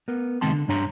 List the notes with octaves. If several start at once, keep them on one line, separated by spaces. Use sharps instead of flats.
B3 A#4
C2 D#3 G#3 C4 A5 C6
D3
G2 D4 C#5 A#5 C6